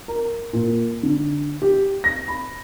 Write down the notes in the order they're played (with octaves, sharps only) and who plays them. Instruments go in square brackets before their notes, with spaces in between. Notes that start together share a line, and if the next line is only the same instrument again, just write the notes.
[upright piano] A#4
A#2
D3
G4
A#6
B5